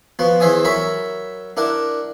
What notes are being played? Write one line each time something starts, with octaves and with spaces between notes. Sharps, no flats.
F3 B3 F#4
E2 E3 C5 E5 G#5 D#6
F#3 A#4 E5 B5 C#6
D4 E4 A#4 F#5 D6